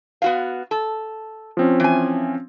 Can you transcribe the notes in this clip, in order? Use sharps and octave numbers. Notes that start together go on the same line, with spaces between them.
B3 F#4 F5
A4
F3 C4 C#4
E3 G#5